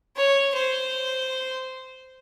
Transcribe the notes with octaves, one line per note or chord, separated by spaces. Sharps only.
C#5
C5